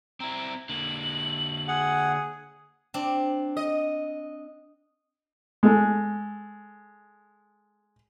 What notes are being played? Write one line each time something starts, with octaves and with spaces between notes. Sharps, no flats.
C4 E4 A#5
D3 A#3 F#7
G#4 F#5
C4 D4
D#5
G#3 A4